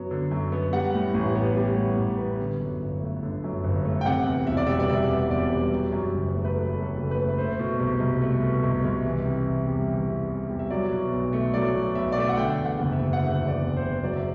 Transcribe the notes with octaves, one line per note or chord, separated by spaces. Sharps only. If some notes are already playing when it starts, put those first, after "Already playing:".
Already playing: F#2 F#3 B3
D3
F#2
B3
G3 F#5
A2
A1
B3
G3
A2
A1
B3
D3
F#2
G1
A3
D3
F#2
G1
A3
G5
C3 F#5
E2
E1 E5
D5
G3 E5
D5
C3 E5
E2
E5
E1 D5
G3
F#3
F#2
F#1
A3
B4
F#3 A4
F#2
A4
F#1
B4
A3
A3 C5
B2
C2
C2
A3
B2
C2
C2
E3
C3
E2
G3
E3
C3
E2
G3
E5
F#3 D5
B2
B1
A3
F#3 D5
B2
B1 E5
D5
A3 E5
F#5
D3 G5
E2
F#5
F#1
E5
F#1
F#5
D3 E5
E2 E5
D5
F#1
C5
F#1
F#3 D5
E5